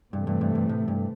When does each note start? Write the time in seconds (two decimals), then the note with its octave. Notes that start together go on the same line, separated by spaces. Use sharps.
0.13 G2 C3 E3 A3
0.27 G2
0.41 G2
0.55 G2
0.69 A2
0.88 G2